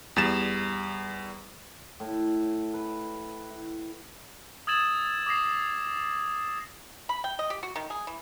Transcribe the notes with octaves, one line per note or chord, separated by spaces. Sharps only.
E2 G3 A6 E7
A2
B4
E4
D#6 E6 G#6 A6 E7 F#7
D6 D#6 A#6 C7
B5
G5
D#5
G4
F#4
D#3
G#4
E3